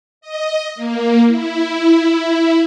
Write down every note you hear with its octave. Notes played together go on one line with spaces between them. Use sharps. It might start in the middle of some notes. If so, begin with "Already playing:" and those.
D#5
A#3
E4